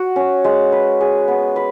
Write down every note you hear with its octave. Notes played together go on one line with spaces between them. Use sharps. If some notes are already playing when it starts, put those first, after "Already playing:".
Already playing: F#4
C#4
G#3
B4
G#4
B3
B4